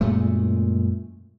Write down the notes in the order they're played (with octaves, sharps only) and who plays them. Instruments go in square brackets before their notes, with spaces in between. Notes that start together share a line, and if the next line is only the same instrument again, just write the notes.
[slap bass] F#2 A#2 G#3 A3